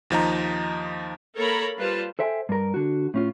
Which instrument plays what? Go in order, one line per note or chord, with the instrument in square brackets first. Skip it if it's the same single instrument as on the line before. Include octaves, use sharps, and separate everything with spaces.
[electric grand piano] D#2 F3 D#4 A#5
[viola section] A#3 A4 A#4 C#5 A#5 B5
G3 F4 B4 C5 A5
[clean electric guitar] A4 C5 E5 G5 G#5
G2 A#4
D3 F#4
A2 C#4 F4